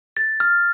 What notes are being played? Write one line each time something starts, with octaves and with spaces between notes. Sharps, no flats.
A6
F6